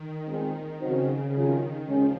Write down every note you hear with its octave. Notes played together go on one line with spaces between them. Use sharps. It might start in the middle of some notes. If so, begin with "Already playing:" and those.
Already playing: D#3
A#2 G#3 C4
C#3 F#3 C4 D#4 F#4 C5
C3 D#3 F#3 C#4 F4 G#4
D#2 C#3 F3 G#3 C#4